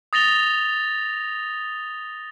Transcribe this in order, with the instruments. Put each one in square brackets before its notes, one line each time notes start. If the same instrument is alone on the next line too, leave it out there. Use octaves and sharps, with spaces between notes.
[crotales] D#6 A6 A#6 F7 G7